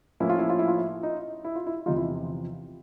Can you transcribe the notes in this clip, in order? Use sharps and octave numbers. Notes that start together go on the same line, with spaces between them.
A2 F3 A#3 C#4 E4
F4
E4
F4
E4
F4
E4
D#4
E4
F4
E4
E2 C3 F3 D#4 F4
E4